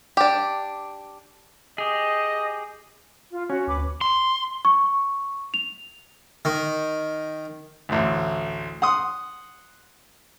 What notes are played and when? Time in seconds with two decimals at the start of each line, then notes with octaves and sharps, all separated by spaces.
0.17 D4 G4
1.78 G4 G#4 D#5
3.31 F4
3.50 C#4 F#4
3.67 D2 B4 D6
4.01 C6
4.65 C#6
5.54 F7
6.45 D#3
7.89 A1 D2
8.82 F#5 C6 D#6